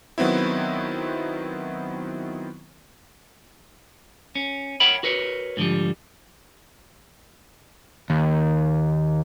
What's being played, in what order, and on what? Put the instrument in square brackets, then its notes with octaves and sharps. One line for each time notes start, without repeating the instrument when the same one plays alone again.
[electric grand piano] D#3 F#3 B3 C4 E4
[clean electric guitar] C#4
A#4 C#5 E5 F#5 G5 B5
F#4 A#4 B4 C#5
G#2 D3 F3 G3
[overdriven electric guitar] D#2